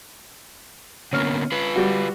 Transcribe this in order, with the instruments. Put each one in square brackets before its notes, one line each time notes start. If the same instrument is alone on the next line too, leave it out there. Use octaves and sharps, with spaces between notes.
[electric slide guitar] D3 A#3 B3 [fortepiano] C#4 F6
[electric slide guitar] F4 B4
[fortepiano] G3 F#4